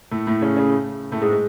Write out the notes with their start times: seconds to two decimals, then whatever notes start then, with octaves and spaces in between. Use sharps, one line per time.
0.11 A2 A3
0.27 A2 A3
0.41 C#3 C#4
0.57 C#3 C#4
1.12 A2 A3
1.22 G#2 G#3
1.33 G#3